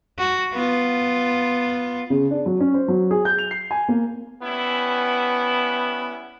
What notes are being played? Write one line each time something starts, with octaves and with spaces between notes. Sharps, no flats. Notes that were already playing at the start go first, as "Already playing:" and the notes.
F#4
B3 F4
C#3
D4
F#3
C#4
C5
F#3
G#4
G6
F7
C7
G#5
A#3
G3 B3 C#4 E4